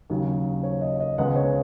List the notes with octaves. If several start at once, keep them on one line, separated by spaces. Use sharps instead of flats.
D#2 C#3 F#3
C#5
D#5
D#5
C#2 C#3 G#3 B3 F#5
C#5